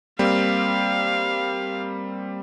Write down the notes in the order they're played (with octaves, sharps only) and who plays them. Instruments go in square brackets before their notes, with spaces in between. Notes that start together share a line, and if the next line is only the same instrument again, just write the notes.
[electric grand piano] G3 A#3 C4 [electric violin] F5